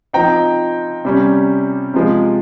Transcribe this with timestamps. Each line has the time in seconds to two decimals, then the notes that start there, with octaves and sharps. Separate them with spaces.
0.13 F3 C4 D#4 G5 A#5
1.05 C3 G3 C#4
1.94 C3 F3 G#3